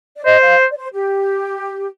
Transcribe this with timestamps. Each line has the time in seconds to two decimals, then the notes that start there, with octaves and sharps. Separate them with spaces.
0.16 D5
0.25 C5 D#5
0.42 F5
0.71 D5
0.76 C5
0.93 G4